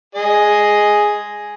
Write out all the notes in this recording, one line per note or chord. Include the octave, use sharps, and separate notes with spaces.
G#4 D#5